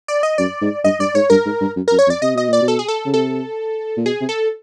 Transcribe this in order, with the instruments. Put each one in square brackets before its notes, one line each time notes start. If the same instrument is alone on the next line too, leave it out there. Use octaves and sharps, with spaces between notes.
[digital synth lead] D5
D#5
[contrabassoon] F#2 [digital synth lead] D5
[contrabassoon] G#2
[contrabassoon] G2 [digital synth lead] D#5
[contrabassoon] G2 [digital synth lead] D5
[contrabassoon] G#2 [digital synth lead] C#5
[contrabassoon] G2 [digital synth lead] A#4
[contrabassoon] G#2
G2
F#2
[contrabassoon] F#2 [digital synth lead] A#4
[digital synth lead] C#5
[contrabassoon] F2
[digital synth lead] D5
[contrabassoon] C3 [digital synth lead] D#5
[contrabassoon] B2 [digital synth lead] D#5
[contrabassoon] A#2 [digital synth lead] D5
[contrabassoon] B2
[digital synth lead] A4
G#4
A4
[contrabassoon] C#3
[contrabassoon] C3 [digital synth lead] A4
[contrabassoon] A#2
[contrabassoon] B2 [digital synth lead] G#4
[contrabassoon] C3
[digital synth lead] A4